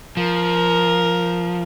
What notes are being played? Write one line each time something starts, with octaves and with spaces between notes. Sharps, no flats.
F3 A#4